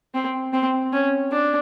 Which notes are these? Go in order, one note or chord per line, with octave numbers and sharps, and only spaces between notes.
C4
C4
C#4
D4